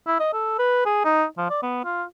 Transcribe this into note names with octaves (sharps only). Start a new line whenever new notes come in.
E4
D#5
A4
B4
G#4
D#4
F3
D5
B3
F4